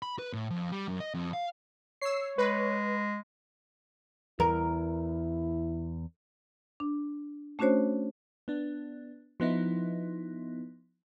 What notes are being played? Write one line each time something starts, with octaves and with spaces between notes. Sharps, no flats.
B5
B4
A2
F2
G3
F#2
D#5
F2
F5
C#5 E6 C7
G#3 B4
E2 E4 A#4
D4
A3 C#4 D4 F#4 C5 C#5
B3 D4
F3 B3 D#4 E4